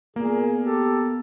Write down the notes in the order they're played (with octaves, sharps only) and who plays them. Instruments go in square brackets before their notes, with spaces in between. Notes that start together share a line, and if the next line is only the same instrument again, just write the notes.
[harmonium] A#2 [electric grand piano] A#3 [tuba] B3 [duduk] G#4
[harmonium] G4 [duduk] A4